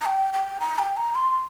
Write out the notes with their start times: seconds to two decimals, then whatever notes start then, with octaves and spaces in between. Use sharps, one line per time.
0.01 A#5
0.06 G5
0.33 G5
0.60 A#5
0.79 G5
0.97 A#5
1.15 C6